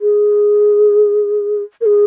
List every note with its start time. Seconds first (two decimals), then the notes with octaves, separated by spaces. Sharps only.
0.01 G#4
1.81 A#4
1.85 G#4